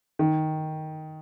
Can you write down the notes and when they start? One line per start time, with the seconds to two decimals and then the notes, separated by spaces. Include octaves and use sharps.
0.19 D#3